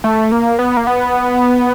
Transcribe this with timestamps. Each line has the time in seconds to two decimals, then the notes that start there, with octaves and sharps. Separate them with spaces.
0.04 A3
0.32 A#3
0.59 B3
0.77 A#3
0.87 B3